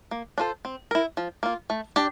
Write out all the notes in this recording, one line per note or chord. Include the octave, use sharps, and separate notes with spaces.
A#3
D4 F4 A4 C5
C4
E4 A#4
F3
A#3 F4
A3
D4 G4